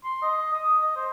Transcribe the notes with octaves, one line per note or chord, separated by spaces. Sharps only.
C6
D#5
D#6
D#5
C5